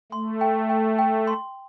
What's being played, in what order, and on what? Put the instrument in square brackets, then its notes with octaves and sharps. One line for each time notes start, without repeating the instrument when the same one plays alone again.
[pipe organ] A3 [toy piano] C6
[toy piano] G5
G5
G5
C6